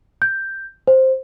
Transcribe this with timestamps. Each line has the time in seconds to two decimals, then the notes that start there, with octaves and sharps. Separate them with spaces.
0.22 G6
0.87 C5